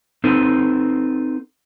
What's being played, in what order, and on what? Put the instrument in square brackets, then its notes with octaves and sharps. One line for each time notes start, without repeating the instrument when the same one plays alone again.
[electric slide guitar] C4 D#4 A4 B4